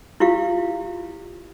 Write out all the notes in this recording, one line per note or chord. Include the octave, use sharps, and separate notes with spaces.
E4 F4 G4 F5